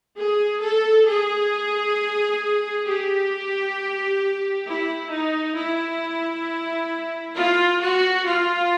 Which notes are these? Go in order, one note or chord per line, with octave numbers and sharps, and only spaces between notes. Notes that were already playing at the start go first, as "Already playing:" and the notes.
G#4
A4
G#4
G4
E4
D#4
E4
F4
F#4
F4